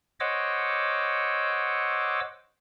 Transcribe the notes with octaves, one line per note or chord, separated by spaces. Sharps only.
C5 C#5 D#5 F#5 D6 E6